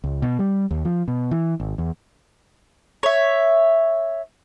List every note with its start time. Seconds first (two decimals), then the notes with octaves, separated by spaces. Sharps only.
0.04 C#2
0.22 B2
0.39 G3
0.71 D#2
0.85 F3
1.08 B2
1.31 E3
1.60 G#1
1.78 E2
3.03 C#5 E5